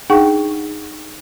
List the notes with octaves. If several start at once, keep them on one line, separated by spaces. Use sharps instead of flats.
D4 D#4 G#4 F#5 G5 C#6